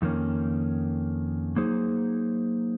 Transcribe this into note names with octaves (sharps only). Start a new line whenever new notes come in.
F2 D#3 A#3 C#4
F#3 A#3 D#4 G#4 C5